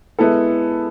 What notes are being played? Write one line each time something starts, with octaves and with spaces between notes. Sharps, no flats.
G#3 B3 E4 A4